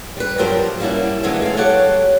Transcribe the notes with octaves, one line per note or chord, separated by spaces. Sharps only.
G3 B4
G2 F3 F#3 G4 A#4 C5
G3 A#3 C#4 E4 F#4
D3 E3 F#3 G#3 A3 C4
G#4 A4 F5
F#3 G4 A4 C#5 F#5